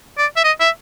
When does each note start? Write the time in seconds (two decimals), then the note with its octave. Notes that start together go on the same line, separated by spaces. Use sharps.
0.18 D5
0.36 E5
0.44 D#5
0.60 E5